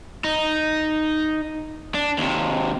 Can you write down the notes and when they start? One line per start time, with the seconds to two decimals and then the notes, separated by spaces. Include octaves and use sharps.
0.24 D#4
1.94 D4
2.18 D#2 C3